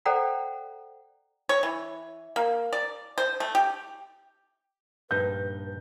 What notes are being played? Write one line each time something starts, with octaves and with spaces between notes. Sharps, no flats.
A4 C5 D5 F#5 G5 A#5
C#5
E3
A#3
D5
C5
A3
G4
A#1 G2 D#4 B4 G6